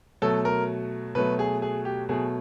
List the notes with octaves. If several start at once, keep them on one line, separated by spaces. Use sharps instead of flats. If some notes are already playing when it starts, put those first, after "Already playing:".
B2 F#3 A3 A4
A#4
B2 F#3 A3 B4
G#4
G#4
G4
B2 F#3 A3 G#4